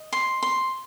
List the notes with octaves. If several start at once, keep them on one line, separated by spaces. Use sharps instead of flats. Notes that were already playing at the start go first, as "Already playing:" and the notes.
Already playing: D#5
C6
C6